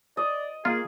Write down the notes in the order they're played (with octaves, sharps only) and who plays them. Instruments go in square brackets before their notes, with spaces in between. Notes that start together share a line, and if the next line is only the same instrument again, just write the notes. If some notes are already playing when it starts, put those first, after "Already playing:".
[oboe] D5 [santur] D#5
[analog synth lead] A#3 [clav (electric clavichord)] F4 [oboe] G#4